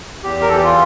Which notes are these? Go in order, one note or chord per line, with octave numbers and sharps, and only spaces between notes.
E2 G4
A#4
E3 A4
G4
F4